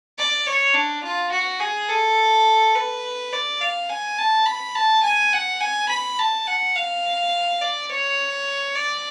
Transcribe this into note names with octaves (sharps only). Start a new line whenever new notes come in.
D5
C#5
D4
F4
F#4
G#4
A4
B4
D5
F5
G#5
A5
B5
A5
G#5
F#5
G#5
B5
A5
F#5
F5
D5
C#5
D5